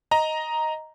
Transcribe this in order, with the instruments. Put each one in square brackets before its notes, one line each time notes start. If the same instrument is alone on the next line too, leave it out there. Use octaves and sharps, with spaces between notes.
[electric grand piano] D#5 A#5